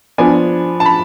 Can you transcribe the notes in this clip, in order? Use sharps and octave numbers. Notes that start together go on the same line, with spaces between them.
F3 B3 D4 G#5
A5
B5